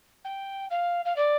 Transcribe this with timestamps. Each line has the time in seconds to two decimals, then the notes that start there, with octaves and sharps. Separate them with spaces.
0.24 G5
0.70 F5
1.05 F5
1.16 D5